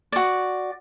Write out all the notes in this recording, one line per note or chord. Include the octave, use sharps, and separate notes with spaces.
F#4 D5